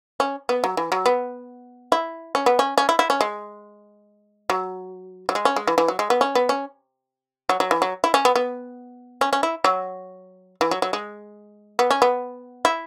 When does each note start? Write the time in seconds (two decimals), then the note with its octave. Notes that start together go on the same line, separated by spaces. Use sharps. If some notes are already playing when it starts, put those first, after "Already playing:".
0.20 C#4
0.49 B3
0.64 F#3
0.77 E3
0.92 F#3
1.06 B3
1.92 E4
2.35 C#4
2.46 B3
2.59 C#4
2.78 C#4
2.89 E4
2.99 E4
3.10 C#4
3.21 G#3
4.50 F#3
5.29 F#3
5.35 G#3
5.45 C#4
5.56 G#3
5.67 E3
5.78 E3
5.88 F#3
5.99 G#3
6.10 B3
6.21 C#4
6.35 B3
6.49 C#4
7.49 F#3
7.60 F#3
7.71 E3
7.82 F#3
8.04 E4
8.14 C#4
8.25 B3
8.36 B3
9.21 C#4
9.33 C#4
9.43 E4
9.64 F#3
10.61 E3
10.71 F#3
10.82 F#3
10.93 G#3
11.79 B3
11.91 C#4
12.02 B3
12.65 E4